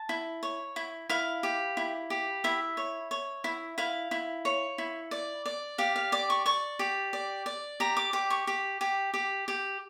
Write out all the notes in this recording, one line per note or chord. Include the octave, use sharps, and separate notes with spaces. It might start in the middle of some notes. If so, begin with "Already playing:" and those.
Already playing: A5
E4
C#5
E4
E4 F5
G4
E4
G4
E4 E5
C#5
C#5
E4
E4 F5
E4
C#5
E4
D5
D5
G4 F5
F5
D5 D6
C#6
D5 C#6
G4
D5
D5
G4 A#5
D6
G4 D6
C#6
G4
G4
G4
G4